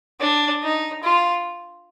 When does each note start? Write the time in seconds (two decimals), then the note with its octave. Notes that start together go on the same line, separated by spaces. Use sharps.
0.20 D4
0.63 D#4
1.03 F4